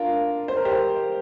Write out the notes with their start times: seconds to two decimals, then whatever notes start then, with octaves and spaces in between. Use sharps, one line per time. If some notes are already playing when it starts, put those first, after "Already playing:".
Already playing: D4 F4 A#4
0.48 C5
0.57 A#4
0.65 G4 C5